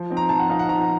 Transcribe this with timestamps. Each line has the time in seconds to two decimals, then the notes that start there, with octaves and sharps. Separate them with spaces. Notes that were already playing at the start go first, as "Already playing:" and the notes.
Already playing: F3
0.10 C4 D#4
0.17 A#5
0.29 F3 A5
0.40 F#5
0.49 C4 D#4 F5
0.59 F#5
0.69 F3 A#5